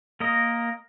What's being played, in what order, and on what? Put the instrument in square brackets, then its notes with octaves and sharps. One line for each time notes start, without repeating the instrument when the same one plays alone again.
[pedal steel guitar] A#3 A#4 D#5